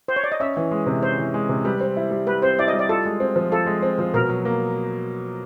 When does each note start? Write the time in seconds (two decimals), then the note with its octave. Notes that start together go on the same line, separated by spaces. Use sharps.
0.08 C5
0.16 C#5
0.24 D5
0.32 D#5
0.40 C#4 E5
0.57 E3
0.71 G#3
0.86 C3
1.03 C#4 C5
1.18 E3
1.34 G#3
1.49 C3
1.65 G3 B4
1.81 C4
1.97 E4
2.11 G3
2.27 G3 B4
2.42 C4 C5
2.59 E4 D5
2.68 D#5
2.73 G3
2.79 D5
2.89 F4 A4
3.05 G#3
3.20 C4
3.36 F3
3.51 F4 A4
3.66 G#3
3.83 C4
3.99 F3
4.14 B2 A#4
4.29 F#3
4.45 A#3